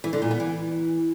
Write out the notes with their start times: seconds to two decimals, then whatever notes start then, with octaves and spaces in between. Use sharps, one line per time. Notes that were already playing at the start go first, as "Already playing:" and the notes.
0.04 E3
0.13 D3
0.22 A#2
0.31 B3
0.40 E3